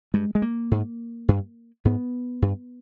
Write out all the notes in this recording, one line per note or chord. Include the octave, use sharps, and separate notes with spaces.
G2 G#3
G#3
A#3
G#2
G2
G#2 B3
G2